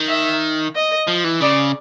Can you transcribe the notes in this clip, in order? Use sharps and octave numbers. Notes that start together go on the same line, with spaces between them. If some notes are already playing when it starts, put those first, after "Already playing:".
Already playing: D#3
E5
D#5
F3
E3
C#3 D5